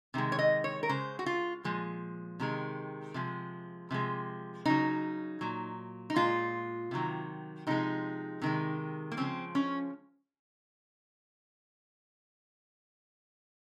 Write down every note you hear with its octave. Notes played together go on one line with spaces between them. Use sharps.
C3 D#3 G#3
C#5
D#5
C#5
A#4
C#3 G#3 C5
F#4
F4
A#2 F3 G#3
C3 D#3 G#3
C3 F3 G#3
C3 F3 G#3
C#3 F#3 D#4
A#2 F#3
D#4
A#2 G#3 F4
C3 D#3 F#3
C3 F3 G#3 D#4
C3 D#3 G#3
A#3
C#3 F3 G#3 C4
C#4